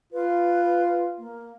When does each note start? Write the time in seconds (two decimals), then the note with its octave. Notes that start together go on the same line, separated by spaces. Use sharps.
0.13 F4 B4
1.18 A#3